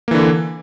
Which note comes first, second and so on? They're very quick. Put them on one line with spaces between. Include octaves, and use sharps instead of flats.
A#3 E3 D3